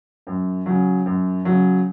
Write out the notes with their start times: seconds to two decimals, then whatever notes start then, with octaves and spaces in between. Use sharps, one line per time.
0.27 F#2
0.66 C#3 F#3
1.06 F#2
1.45 C#3 F#3